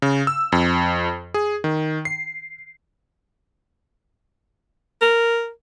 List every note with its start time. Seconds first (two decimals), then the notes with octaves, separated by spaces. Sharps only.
0.02 C#3
0.27 E6
0.52 F2
1.34 G#4
1.64 D#3
2.05 C7
5.02 A#4